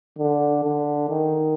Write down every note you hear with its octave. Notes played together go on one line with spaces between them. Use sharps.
D3
D3
D#3